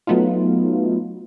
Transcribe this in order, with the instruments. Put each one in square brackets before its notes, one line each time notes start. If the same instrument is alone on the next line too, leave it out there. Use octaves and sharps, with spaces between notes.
[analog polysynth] F#3 A3 B3 D#4 F4